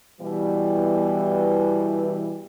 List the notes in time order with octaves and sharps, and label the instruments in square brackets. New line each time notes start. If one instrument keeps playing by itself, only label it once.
[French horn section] B2 E3 G3